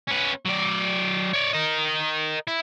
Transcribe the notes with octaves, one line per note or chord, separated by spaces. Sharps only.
C#4 B4
F#3 D5
C#5 D5
A#4 D#5
E4